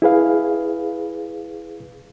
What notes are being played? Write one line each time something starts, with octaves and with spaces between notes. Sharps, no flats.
E4 G#4 B4 F5